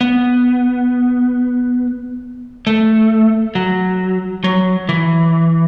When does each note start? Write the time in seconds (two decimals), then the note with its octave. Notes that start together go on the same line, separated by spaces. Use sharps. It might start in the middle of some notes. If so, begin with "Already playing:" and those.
0.01 B3
2.67 A3
3.55 F#3
4.44 F#3
4.89 E3